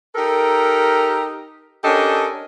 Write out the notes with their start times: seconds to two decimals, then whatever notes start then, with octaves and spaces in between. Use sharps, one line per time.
0.16 D#4 G4 A4 A#4
1.84 C#4 D4 G4 A4 A#4 D#5